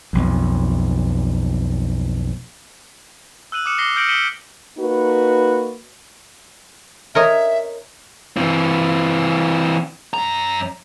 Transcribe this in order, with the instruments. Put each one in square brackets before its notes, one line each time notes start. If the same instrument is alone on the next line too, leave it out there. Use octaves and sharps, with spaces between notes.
[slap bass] B1 F2
[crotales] E6 F#6 D#7 F#7
D6 D#6 F6 C#7 E7
D6 A#6 C7 G7
F6 G6 A#6 C#7 D7 F#7
B6 C#7 D#7 E7 F#7 G7
[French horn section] A#3 D#4 F#4 B4
[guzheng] A#4 C#5 D#5 [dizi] E5
[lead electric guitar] E3 C4
F#2 A#5